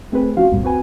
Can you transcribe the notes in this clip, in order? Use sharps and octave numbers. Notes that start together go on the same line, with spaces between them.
A3 C4 G#4 B4
F3 C#4 F4 F#4 F5
C2 F2 A#2 G3
C4 F#4 B4 G#5